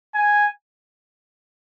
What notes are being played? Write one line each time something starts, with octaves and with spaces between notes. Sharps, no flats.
G#5